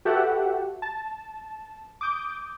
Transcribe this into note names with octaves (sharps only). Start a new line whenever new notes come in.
F#4 G4 A4 B4 E5 F#5
A5
D6 D#6 G6